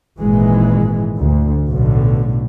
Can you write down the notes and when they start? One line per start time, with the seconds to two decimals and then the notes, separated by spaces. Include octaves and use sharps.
0.19 G#1 A#2 E3 G#3
1.18 D2
1.71 B1 A2 D3